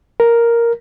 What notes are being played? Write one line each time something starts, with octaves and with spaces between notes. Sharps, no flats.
A#4